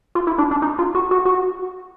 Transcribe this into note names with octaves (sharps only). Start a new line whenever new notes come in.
F4
E4
D4
D4
D#4
F4
F#4
F#4
F#4